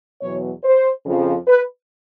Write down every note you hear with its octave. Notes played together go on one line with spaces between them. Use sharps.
E2 B2 F#3 C#5
C5
F2 C#3 F3
B4